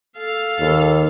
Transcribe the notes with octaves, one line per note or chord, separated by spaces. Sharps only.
A4 F5
D#2